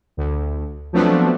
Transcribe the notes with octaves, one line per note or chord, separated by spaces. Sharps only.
D2
F3 F#3 A3 B3 C4 D4